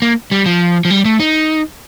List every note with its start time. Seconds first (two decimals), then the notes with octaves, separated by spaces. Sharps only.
0.02 A#3
0.31 G3
0.46 F3
0.85 F3
0.90 G3
1.05 A3
1.20 D#4